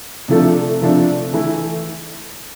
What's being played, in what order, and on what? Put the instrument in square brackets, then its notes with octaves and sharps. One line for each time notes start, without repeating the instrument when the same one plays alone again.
[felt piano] C3 F3 A3 D4 A4
C3 F3 A3 D4 A4
E3 A3 E4